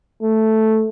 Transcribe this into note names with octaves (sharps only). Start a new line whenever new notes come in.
A3